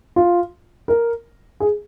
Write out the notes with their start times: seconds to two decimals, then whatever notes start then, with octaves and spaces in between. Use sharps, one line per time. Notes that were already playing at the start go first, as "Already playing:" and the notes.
0.16 F4
0.88 A#4
1.60 G#4